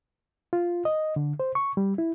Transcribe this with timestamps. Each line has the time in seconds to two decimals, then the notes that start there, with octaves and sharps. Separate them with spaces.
0.53 F4
0.85 D#5
1.16 D3
1.40 C5
1.55 C#6
1.77 G3
1.98 E4